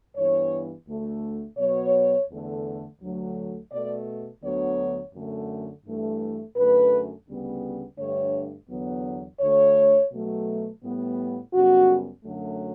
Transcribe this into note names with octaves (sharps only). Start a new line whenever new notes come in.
G2 E3 B3 C#5
D2 D3 A3
B2 F#3 B3 C#5
E2 D3 A3
D2 D3 F#3 A3
B2 A3 D5
D2 D3 F#3 B3 C#5
F#2 D3 A3
G2 E3 A3
F#2 D3 A3 B4
D2 C#3 G3 B3
G2 D3 A3 C#5
E2 D3 F#3 B3
D2 D3 A3 C#5
B2 F#3 A3
A2 G3 B3
F#2 C#3 G3 B3 F#4
F#2 D3 F#3 A3